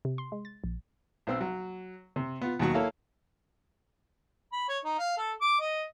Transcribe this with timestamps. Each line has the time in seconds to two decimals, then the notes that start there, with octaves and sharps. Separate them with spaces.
0.05 C3
0.18 C6
0.32 G#3
0.45 A6
0.64 A#1
1.27 B1 C4 E6
1.41 F#3
2.16 C3
2.41 B3 F4
2.59 D#2 B2 F#3 F#4
2.74 A#3 E4 A4 C#5 F5
4.52 B5
4.69 C#5
4.84 D#4
4.98 F5
5.18 A4
5.41 D6
5.60 D#5